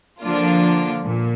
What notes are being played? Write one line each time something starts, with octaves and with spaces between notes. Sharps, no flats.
D3 F3 A#3 D4 F4
A#2